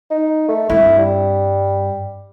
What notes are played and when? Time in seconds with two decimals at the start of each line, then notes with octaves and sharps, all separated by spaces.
0.11 D#4
0.48 A3
0.69 G2 C4 E4
0.98 G3